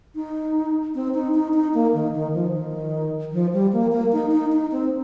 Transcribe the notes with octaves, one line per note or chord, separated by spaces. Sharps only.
D#4
C4
D#4
D#4
D#4
A#3
D#3
D#3
F3
D#3
F3
G3
A#3
A#3
D#4
D#4
D#4
C4